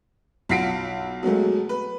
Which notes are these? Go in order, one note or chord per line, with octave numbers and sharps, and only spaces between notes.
B1 F4 F#5 B6 C7 D7
B2 F#3 G#3 A3
B4